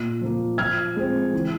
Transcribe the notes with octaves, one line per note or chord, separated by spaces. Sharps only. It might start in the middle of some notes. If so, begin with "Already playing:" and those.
Already playing: A#2
F3 A#3
F3 F6 G#6
G#3 C4
E3